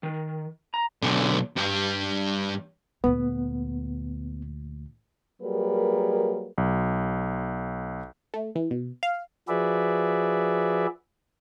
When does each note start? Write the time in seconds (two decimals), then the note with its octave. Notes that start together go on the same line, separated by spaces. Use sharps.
0.03 D#3
0.74 A#5
1.02 B1 D3
1.57 G2 G3
3.04 D2 A#2 B3
5.42 F#3 G3 A#3 G#4 A#4 B4
6.58 B1
8.34 A3
8.55 E3
8.71 B2
9.03 F5
9.48 F3 F#4 G#4 B4 D5 E5